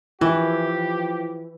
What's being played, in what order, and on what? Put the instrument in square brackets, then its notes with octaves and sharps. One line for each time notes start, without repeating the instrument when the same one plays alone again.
[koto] E3 [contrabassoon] F3 [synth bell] E4 [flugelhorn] G4